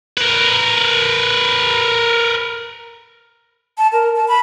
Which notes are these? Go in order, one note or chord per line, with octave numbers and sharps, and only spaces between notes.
A#4 B4
A5
A#4
A5
B5